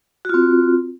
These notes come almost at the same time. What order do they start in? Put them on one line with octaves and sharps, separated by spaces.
F#4 F4 C4